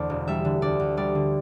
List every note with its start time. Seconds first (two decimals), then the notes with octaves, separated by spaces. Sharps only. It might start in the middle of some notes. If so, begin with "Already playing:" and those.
Already playing: E2 D3 A3 C5 D5
0.10 E1
0.28 G3 E5
0.45 D3
0.62 D2 D5
0.80 D2
0.97 G3 D5
1.15 D3